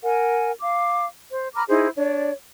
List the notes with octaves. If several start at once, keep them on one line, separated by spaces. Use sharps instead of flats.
A#4 F#5 G#5
F5 D6
C5
A#5 B5 D6 F6
D#4 E4 G#4 C5
D4 C#5 D5